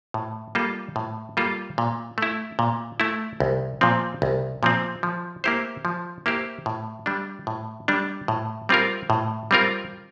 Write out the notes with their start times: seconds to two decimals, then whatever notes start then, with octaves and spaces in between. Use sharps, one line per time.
0.14 A2
0.55 G3 A#3 F4 A4
0.96 A2
1.37 G3 A#3 F4 A4
1.78 A#2
2.18 A3 E4
2.59 A#2
3.00 A3 E4
3.40 C2
3.81 A#2 F3 C4
4.22 C2
4.63 A#2 F3 C4
5.03 F3
5.44 A#3 E4 G4 C5
5.85 F3
6.26 A#3 E4 G4 C5
6.66 A2
7.06 G3 D4
7.47 A2
7.88 G3 D4
8.28 A2
8.69 G3 C4 F4 A#4
9.10 A2
9.51 G3 C4 F4 A#4